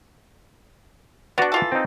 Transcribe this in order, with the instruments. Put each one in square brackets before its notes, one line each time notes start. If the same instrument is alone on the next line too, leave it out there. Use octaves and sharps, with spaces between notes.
[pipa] B3 D4 [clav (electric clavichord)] F#4 D5
[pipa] E3 F4 A4
[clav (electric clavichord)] C4 D#4